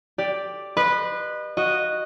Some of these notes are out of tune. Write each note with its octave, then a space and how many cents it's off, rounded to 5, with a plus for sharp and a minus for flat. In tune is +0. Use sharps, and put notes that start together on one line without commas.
G4 +10 D5 +0
B4 -10 D#5 -35 C6 -35
F#4 -5 D#5 -10